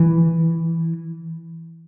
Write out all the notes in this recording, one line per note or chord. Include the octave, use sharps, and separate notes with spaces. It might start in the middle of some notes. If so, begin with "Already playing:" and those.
Already playing: E3